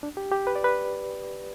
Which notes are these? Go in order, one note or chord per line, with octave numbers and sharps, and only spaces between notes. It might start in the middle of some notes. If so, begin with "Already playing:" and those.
D4
G4
G4
B4
D5
B4